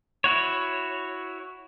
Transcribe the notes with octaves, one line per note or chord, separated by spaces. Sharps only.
E4 F#4 C#5